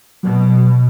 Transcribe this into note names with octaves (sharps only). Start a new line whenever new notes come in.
B2 F#3